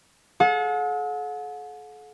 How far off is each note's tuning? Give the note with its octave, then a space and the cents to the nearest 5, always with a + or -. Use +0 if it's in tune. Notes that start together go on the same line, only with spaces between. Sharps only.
A4 -45 F#5 -40